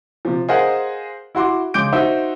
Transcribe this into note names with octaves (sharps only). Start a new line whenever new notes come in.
C3 F3
G#4 A#4 C5 D#5 F5 F#5
E4 F#4 C6 D6
C#3 G#3 D6 G6 D7
D#4 F#4 C5 E5